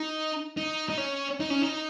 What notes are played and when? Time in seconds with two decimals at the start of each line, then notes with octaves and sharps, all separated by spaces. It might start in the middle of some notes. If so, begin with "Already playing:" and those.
Already playing: D#4
0.57 D#4
0.89 D#4
0.97 C#4
1.40 D#4
1.50 C#4
1.62 D#4